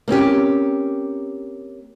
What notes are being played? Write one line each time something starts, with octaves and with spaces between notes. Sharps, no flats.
A#3 C4 C#4 G4